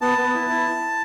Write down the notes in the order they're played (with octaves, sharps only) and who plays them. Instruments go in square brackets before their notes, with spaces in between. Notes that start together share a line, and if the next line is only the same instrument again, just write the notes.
[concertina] B3 A5
B3
E4
E4